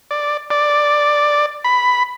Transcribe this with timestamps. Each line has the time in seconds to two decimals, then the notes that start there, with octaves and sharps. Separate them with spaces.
0.11 D5
0.50 D5
1.64 B5